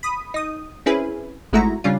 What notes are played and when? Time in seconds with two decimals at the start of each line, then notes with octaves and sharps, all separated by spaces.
0.03 B5 D#6
0.34 D#4 D#6
0.86 C4 C#4 E4 G#4 B4
1.53 G#1 G#3 A3 E4 F#4 A#5
1.84 C#3 G3 C#4 D4 F4